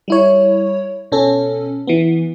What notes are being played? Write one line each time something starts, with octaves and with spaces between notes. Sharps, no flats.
G3 E4 C#5
B2 C#4 A4
E3 B3